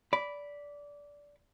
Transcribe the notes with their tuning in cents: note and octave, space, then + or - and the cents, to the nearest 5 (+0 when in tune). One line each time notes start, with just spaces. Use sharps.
D5 -15 B5 +0